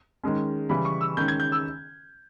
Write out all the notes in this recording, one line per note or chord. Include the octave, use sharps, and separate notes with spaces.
D#3 G#3 C#4
C#3 E3 G3 B5
C#6
E6
D#3 G#3 C#4 G6
G#6
G6
E6